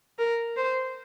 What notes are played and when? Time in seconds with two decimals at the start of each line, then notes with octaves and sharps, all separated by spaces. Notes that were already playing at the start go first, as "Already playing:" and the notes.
0.19 A#4
0.56 C5